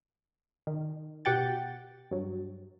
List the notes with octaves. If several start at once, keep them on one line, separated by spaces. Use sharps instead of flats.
D#3
B2 G4 F#5 G5 A6
G2 F#3